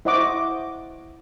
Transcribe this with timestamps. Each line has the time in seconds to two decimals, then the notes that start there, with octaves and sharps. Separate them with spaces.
0.05 E4 C5 D#5 F#5 C#6 D6